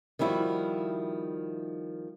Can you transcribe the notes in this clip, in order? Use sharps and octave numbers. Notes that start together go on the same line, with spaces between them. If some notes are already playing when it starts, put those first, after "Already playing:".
D#3 F3 G3 E4 F#4